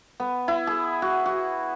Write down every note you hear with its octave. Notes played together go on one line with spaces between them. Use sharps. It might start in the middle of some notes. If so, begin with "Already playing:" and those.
B3
E4
G#4
F#4
F#4